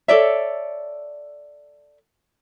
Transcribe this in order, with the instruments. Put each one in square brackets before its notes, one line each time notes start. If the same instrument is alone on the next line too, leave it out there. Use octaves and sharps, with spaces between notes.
[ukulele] A4 C#5 D5 E5